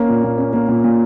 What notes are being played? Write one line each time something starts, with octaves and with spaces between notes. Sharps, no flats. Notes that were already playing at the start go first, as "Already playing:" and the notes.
Already playing: A#3 C#4
A#2
A#2
C#4
A#3
A#2
A#2